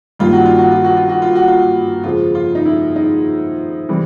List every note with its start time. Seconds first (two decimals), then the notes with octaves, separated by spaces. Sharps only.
0.19 G2 D#3 G3 A#3 F4
0.32 F#4
0.46 F4
0.58 F#4
0.71 F4
0.84 F#4
0.97 F4
1.09 F#4
1.22 F4
1.35 F#4
1.48 F4
2.04 F2 C#3 F3 G#3 F4
2.35 F4
2.55 D#4
2.65 E4
2.96 D#4
3.89 C3 E3 G3